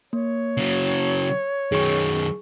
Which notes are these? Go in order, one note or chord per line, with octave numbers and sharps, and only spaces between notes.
A#3 C#5
C#3 F#3
F#2 D#3 G#4 C#6